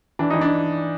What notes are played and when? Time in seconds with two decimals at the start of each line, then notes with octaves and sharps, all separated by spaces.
0.19 E3 D4
0.30 E3 D#4
0.41 D4